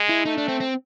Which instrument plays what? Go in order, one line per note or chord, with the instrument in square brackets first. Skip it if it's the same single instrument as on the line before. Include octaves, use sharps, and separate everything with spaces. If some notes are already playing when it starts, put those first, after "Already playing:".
Already playing: [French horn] G#3
[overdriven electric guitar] E4
[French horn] A3 [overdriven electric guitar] D#4
[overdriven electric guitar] D4
C4
C4